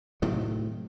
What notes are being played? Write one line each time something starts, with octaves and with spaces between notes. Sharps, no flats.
A2 C3 D#3 F#3